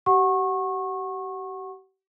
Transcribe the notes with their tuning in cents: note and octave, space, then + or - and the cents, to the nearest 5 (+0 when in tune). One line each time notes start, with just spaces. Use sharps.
G4 -40 F#5 +0 C#6 -25